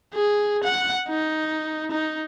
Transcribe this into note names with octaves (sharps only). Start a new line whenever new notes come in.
G#4
F#5
D#4
D#4